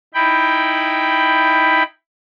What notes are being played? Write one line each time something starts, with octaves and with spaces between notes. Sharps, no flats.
D#4 E4 G5 B5